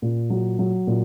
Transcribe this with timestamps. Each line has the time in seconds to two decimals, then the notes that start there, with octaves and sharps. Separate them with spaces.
0.02 A#2
0.30 F#3
0.59 F#3
0.87 A#2